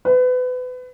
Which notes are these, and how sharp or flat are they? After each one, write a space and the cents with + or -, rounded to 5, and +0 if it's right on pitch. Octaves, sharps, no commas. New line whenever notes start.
B4 +30